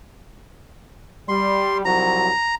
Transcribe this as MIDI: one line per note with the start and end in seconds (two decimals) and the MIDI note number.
1.29 1.84 55
1.29 1.78 84
1.85 2.30 36
1.85 2.30 53
1.85 2.30 54
1.85 2.55 82